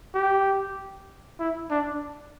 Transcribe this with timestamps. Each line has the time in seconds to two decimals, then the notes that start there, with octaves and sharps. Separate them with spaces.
0.14 G4
1.39 E4
1.71 D4